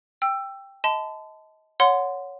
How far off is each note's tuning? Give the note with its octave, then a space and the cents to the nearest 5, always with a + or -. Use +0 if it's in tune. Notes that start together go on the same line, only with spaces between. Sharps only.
G5 +5 E6 +20
D#5 +30 A5 -10 C6 -40
C#5 +10 F#5 -20 C6 -20